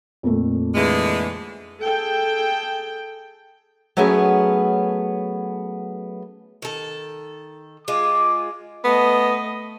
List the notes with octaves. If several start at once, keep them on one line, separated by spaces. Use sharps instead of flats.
F2 A#2 A3
D3 E3 G#3
G#4 A4 G5
F#3 A3 B3 C#4 G#4
D#3 A4
G#3 F4 D6
A3 B3 D#5